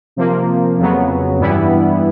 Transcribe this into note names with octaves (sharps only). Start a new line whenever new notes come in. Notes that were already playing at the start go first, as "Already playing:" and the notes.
C3 F3 A#3
F2 C#3 F#3 B3
G2 E3 G3 B3 E4